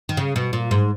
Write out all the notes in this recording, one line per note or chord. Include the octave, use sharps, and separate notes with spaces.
D#3
C#3
B2
A#2
G#2